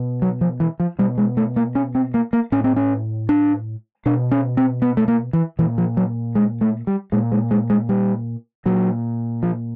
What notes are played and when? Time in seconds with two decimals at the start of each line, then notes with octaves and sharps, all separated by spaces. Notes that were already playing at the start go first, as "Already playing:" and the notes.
Already playing: B2
0.22 F#3
0.41 F3
0.60 E3
0.80 F3
0.99 B2 G3
1.18 G#3
1.37 A3
1.56 A#3
1.75 C#4
1.95 C4
2.14 A#3
2.33 A#3
2.52 A2 C#4
2.64 C4
2.76 C#4
3.29 D4
4.06 B2 D4
4.32 C#4
4.57 C4
4.82 B3
4.97 A3
5.08 A#3
5.33 E3
5.59 A#2 E3
5.78 F3
5.97 F#3
6.35 G#3
6.61 A3
6.87 G3
7.12 A#2 G#3
7.32 G#3
7.51 G#3
7.70 G#3
7.89 G3
8.66 A#2 F#3
9.43 F3